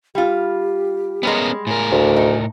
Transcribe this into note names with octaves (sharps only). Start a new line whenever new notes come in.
G3 F4 G4
G3 G#3 B3 C#4 A#4
A2 A#4 G#5
D2
D#4